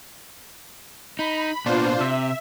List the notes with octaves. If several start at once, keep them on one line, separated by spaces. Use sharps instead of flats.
D#4 B5
A#2 B3 D4 F4 C5
C3 E5